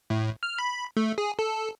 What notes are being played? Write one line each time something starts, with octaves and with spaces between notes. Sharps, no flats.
A2
F6
B5
A3
G#4
A4